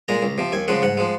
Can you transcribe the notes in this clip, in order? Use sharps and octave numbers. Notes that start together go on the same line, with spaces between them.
A#2 G#3 A#5
C#2
C3 F3
D#2 G#5
C#3 F3 G#3 F#5
G#2 F#5
F3 G#3